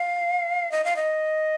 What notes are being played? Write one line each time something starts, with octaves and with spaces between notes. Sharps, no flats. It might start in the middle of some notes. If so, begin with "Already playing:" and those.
Already playing: F5
D#5
F5
D#5